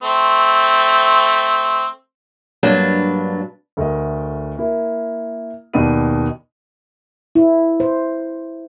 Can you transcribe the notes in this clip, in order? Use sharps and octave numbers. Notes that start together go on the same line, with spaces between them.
A3 C4
G2 F#3 A#3 D4 B4
D2 A3 A#4 D#5
A#3 E4
D#2 B2 D#4 D5 B5 D#7
E4
C5